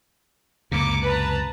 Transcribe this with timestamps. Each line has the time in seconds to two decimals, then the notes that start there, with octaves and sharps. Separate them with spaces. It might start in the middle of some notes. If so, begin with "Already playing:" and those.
0.72 C#2 F#2 C3 A#3 D6 C#7
1.03 B4 A5 A#5